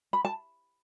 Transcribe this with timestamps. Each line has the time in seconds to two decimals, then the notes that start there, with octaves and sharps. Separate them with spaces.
0.13 B5
0.25 A5